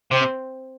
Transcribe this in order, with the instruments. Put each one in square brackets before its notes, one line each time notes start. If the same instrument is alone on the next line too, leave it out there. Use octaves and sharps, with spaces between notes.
[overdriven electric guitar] C3 [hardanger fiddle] C4